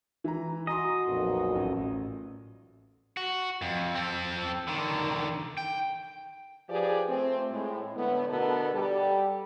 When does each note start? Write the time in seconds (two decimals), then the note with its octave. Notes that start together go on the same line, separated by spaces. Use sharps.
0.24 E3 A#5
0.67 F#4 D#5 G#5 A#5 C6
1.08 B1 F2 A#2
1.55 A1
3.17 F#4
3.62 F2
3.95 C4 A4
4.67 D3 D#3
5.58 G5
6.70 F3 G4 G#4 B4 D5
7.08 A3 C4
7.51 A2 G#3
7.95 A2 D3 A3 B3
8.28 B2 D3 B3 D4 A4 A#4
8.73 G3 G4 A4